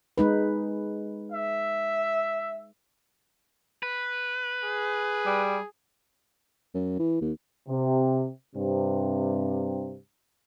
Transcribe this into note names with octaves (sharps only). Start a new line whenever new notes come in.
G#3 D#4 B4
E5
B4
G#4
G3
F#2
E3
D#2
C3
G2 C3